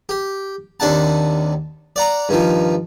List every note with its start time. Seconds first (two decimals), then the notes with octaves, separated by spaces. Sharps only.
0.09 G4
0.80 D#2 C3 D4 F#5 A5
1.96 D5 F#5 A#5
2.29 G2 D#3 F3